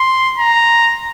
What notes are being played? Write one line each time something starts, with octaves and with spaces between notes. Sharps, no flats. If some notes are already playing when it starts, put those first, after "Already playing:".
Already playing: C6
A#5